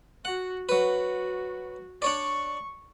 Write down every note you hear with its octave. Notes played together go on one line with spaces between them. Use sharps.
F#4 F#5
F#3 F#4 B4
D4 C#5 D5 C#6